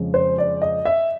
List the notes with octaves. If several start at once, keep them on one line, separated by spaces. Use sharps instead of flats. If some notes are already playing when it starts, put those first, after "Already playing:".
Already playing: F2 C#3 F3 G#3
C5
D5
D#5
E5